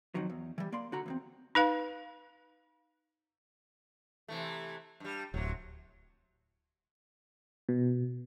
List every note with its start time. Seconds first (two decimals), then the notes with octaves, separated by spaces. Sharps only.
0.15 F2 D#3 F3 F#3
0.30 E2
0.58 E3 G3
0.72 A#3 D5 C6
0.92 D3 F#4 A#5
1.06 E2 A#3 C4
1.55 D#4 B4 F5
4.28 C3 E3 A3
5.00 G2 G3
5.34 D1 C3 F#3
7.69 B2